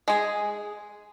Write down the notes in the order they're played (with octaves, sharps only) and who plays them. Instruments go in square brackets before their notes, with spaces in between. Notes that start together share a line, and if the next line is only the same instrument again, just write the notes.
[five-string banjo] G#3 G#4